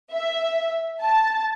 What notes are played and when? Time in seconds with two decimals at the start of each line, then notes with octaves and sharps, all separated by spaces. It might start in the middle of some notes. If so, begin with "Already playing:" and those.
0.11 E5
1.00 A5